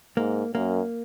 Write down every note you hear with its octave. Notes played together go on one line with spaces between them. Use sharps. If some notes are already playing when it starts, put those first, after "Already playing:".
G#2 A#3
F#2 A#3